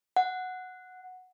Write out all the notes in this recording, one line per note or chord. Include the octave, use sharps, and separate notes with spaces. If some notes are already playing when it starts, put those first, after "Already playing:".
F#5